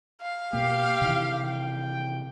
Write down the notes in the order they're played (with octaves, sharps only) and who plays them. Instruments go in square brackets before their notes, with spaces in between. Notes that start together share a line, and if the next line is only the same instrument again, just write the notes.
[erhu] F5
[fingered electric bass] B2 A#3 [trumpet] G4
[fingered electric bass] C3 D#3 E3
[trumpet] G5